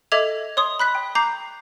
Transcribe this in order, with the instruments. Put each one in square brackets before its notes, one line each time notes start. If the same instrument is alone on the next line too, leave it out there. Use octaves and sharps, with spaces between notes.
[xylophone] A4 D#5 E5 D6 G#6 F7
C#5 C6 D#6
B5 F#6 B6
G5
A#5 D6 G6 C7